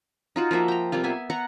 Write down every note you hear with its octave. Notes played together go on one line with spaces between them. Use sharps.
D#4 F4 F#4
F3 A#3 F#4 E5
G5 A#5
C3 G3 A#3 F4
B3 E5 G#5
B3 F#5 A#5 C#6